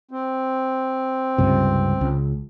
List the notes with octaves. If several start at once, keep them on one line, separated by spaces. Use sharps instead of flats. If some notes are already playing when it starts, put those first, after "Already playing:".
C4
C#2 G2 C3
C#2